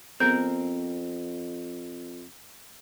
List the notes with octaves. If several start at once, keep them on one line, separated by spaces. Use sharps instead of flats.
F2 B3 C4 G#4 A#4 G6